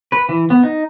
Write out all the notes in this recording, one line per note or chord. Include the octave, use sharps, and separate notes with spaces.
B4
E3
B3
D#4